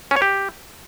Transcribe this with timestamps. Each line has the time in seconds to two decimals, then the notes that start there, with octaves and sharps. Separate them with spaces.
0.11 C#4
0.16 C#5
0.22 G4